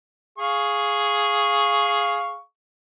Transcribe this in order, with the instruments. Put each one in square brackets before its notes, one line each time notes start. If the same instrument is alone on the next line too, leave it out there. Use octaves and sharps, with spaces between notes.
[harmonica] G#4 F5 C#6